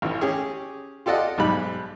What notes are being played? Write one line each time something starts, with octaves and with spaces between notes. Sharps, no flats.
A1 E3
C#4 G4 G#4
F4 G4 A4 D5 D#5 F#5
B1 G#2 G3 B5 F#6